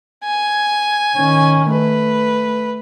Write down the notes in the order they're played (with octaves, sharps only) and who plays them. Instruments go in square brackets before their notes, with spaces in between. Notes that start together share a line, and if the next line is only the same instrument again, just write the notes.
[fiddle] G#5
[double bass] D#3 C#4
[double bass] A3 [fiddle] B4